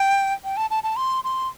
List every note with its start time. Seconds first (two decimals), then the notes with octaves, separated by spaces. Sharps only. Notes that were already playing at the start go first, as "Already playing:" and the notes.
Already playing: G5
0.44 G5
0.57 A5
0.71 A5
0.83 A5
0.96 C6
1.24 C6